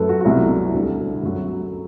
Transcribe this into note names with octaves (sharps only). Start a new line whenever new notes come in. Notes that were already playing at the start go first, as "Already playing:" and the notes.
Already playing: F#2 F#3 A3 A4 B4
F#4
F#4
C2 B2 F#3 A3 E4
D2 D3 G3
F#2 F#3 A3